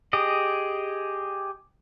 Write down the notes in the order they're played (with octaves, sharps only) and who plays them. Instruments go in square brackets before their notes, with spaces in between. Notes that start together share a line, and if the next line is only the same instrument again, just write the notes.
[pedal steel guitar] G4 G#4 D#5